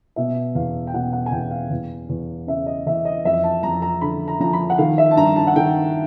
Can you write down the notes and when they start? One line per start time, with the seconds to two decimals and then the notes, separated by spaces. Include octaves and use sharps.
0.16 B2 E5
0.55 E2 F5
0.87 G5
0.94 B2 F#5
1.13 F#5
1.26 G#5
1.32 E2 G5
1.51 F5
1.70 E2
2.09 E2
2.47 C#3 E5
2.66 D#5
2.86 E3 E5
3.05 D#5
3.25 F2 E5
3.43 A5
3.63 F2 A#5
3.82 A#5
4.01 D3 B5
4.28 A#5
4.40 F3 A#5
4.53 B5
4.70 F#5
4.78 D#3 F5
4.98 E5
5.11 A5
5.17 G2 A#5
5.36 A5
5.47 F#5
5.56 D#3 G5